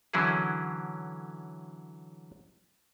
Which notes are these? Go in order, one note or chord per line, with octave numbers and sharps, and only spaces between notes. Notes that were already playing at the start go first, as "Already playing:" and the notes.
D3 E3 F#3 C#4 E4 G#4